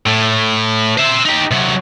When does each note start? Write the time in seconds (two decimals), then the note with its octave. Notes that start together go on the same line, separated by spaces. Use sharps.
0.06 A2
0.98 C5 E5
1.25 D#4 G4
1.51 C3 F#3